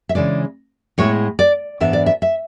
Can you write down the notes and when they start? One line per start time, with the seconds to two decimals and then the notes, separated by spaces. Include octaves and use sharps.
0.09 E5
0.15 C#3 E3 G#3 D4 D5
0.98 A2 G#3 B3 E4 C#5
1.39 D5
1.80 G#2 E3 B3 D4 E5
1.93 D5
2.06 E5
2.22 E5